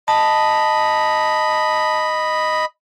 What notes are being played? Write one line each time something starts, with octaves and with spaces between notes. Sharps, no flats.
D#5 A5 B5